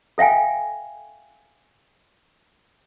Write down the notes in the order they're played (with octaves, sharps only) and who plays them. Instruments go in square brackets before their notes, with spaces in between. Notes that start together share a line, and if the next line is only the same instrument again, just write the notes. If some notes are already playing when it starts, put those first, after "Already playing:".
[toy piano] A4 E5 F5 G5 G#5